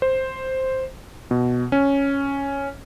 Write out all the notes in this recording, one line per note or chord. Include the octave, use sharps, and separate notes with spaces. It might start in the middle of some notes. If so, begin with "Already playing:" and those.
C5
B2
C#4